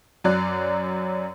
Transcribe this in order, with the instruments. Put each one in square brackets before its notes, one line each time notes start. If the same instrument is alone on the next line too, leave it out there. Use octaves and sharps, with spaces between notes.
[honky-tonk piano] F#2 F#3 D5 F#6